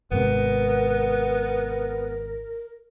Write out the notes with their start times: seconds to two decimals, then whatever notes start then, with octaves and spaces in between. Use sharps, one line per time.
0.11 G#1 G#2 C3 B3 A#4